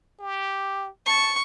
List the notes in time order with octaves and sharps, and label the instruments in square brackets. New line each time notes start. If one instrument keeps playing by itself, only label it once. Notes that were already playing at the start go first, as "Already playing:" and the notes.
[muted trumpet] G4
[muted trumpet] A5 [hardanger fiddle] C#6